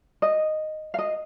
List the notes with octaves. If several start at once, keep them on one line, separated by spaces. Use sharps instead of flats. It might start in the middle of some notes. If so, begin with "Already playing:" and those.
D#5
F5
D#5